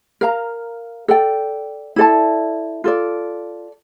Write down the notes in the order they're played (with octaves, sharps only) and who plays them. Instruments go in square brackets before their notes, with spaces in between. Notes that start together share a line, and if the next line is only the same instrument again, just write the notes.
[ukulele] A#4 F5 A#5
A4 D5 G5
E4 A4 D5 A5
F4 A4 D5